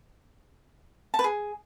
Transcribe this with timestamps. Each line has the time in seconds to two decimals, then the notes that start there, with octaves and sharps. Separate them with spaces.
1.14 A5
1.19 B4
1.24 G#4